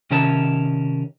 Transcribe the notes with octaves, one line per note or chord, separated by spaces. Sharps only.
C3 D#3 C#4 A#4 C#5 A5